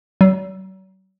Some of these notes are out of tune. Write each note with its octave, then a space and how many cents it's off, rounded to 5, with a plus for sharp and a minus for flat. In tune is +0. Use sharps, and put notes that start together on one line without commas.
F#3 +40